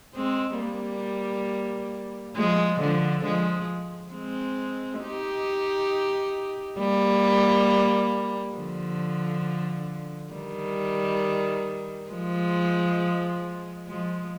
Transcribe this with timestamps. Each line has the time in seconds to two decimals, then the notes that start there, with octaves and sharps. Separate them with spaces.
0.15 G#3 C4
0.59 G3 A#3
2.36 F3 G#3
2.80 D3 F3
3.24 F3 G#3
4.13 G#3 C4
5.02 D#4 G4
6.79 G3 A#3
8.55 D3 F3
10.32 D#3 G3
12.10 F3 G#3
13.88 F3 G#3